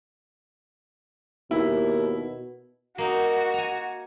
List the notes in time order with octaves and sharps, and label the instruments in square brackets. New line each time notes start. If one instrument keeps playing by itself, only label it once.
[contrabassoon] D#2 [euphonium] B2 [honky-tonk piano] E4 [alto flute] A#4
[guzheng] A#3 D#4 [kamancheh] F#4
[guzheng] G#5 A#5